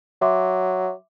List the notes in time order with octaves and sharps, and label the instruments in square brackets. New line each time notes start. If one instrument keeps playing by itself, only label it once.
[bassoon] F#3 [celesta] E5 C6 D6